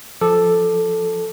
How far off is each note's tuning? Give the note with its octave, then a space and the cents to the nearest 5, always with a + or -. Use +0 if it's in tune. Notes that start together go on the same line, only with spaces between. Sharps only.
F3 +0 A4 +0 D6 +20